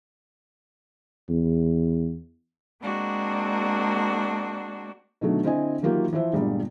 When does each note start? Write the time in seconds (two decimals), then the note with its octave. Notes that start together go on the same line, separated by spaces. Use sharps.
1.29 E2
2.82 G#3 A#3 C4 D4 F#4
5.21 B2 D3 D#3 F#3 A3
5.43 D3 C4 E4 D#5 G#5
5.82 D#3 E3 F#3 A#3 F4 G4
6.13 E3 F3 C5 E5
6.33 G1 A#2 D3 G3 G#3